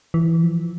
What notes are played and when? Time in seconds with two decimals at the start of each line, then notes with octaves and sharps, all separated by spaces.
0.14 E3
0.43 F3